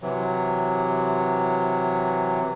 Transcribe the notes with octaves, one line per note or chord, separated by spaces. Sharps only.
C3 E3 F#3